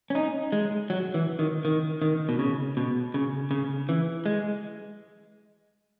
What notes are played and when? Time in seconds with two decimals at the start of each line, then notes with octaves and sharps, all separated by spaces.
0.10 C#4
0.15 D#4
0.52 G#3
0.90 F#3
1.14 E3
1.39 D#3
1.65 D#3
2.02 D#3
2.29 B2
2.39 C#3
2.77 B2
3.14 C#3
3.51 C#3
3.89 E3
4.26 G#3